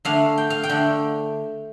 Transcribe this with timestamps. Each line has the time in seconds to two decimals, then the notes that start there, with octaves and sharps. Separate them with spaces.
0.05 D3 A3 D4 F5
0.37 G5
0.50 F5
0.63 G5
0.69 D3 A3 D4